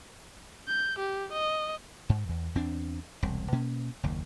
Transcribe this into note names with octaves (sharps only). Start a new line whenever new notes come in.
G6
G4
D#5
G#2
E2
E2 C4 D4
E1 C2
B2 A#3 C#4
F#1 D#2